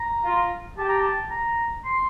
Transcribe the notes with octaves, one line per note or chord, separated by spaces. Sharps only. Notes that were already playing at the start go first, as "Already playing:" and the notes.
Already playing: A#5
F4
G4 A5
A#5
A5
A#5
C6